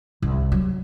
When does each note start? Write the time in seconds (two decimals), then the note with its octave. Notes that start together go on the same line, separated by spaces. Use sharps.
0.22 C2
0.52 F#3